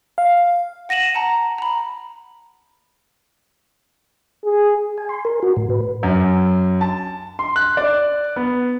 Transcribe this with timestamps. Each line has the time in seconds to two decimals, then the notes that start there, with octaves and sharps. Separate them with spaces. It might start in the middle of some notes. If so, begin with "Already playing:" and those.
0.18 F5
0.89 F#5 A#6 D#7 E7 F#7
1.15 F#5 A5 A#5
1.58 A#5 B5
4.45 G#4
4.98 G#5
5.09 C6
5.25 A#4
5.43 F#4
5.57 A2
5.70 B4
6.03 F#2
6.81 A5
7.39 C6
7.56 F#6
7.77 D5
8.36 B3